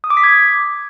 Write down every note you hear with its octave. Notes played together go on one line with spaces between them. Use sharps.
D#6
D6
B6
G#6